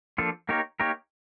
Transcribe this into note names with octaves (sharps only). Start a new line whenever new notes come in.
F3 A#3 D4 F4 A4
A#3 D#4 G4 A#4 C#5
A#3 D#4 G4 A#4 C#5